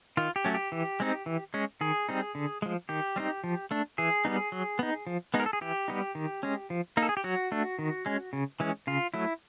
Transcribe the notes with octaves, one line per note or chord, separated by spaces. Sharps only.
D#3 F4
G4
F#3 A3 C#4
G4
E3
G#3 C4 D#4
E3
G#3 C#4
D#3 G#4
G3 C4 D#4
D3
F3 G#3
D#3 G4
G3 C4 D#4
F3
A3 D4
E3 G#4
G3 B3 D#4
F#3
B3 D#4
F3
G#3 B3 D#4
A#4
A4
G#4
E3 G4
G3 B3 D#4
D#3
G#3 C#4
F3
A#3 D#4
A4
G#4
G4
F#3 F#4
A3 D4
D#3
G#3 C#4
C#3
E3 G#3 C#4
C#3 F4
F#3 A3 E4